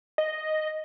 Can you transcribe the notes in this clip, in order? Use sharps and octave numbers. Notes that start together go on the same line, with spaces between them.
D#5